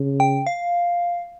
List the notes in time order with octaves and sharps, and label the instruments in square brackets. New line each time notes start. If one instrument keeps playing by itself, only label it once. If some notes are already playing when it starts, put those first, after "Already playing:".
Already playing: [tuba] C#3
[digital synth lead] G5
F5